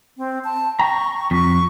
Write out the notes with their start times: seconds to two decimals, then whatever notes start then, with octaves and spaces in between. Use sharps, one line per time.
0.17 C4
0.44 A5
0.79 G5 A#5 C#6
1.31 F2 C#6